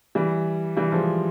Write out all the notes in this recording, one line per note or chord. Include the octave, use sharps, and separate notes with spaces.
E3 G3
E3 G3
F3 G#3